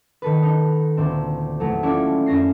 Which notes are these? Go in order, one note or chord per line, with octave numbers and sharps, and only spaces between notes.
D#3 A4 B4
D#4
D2 A#2 C4
E2 F#3 A3
C#4 E4 F4 A4 D5
F#2 C#4 A#6 C7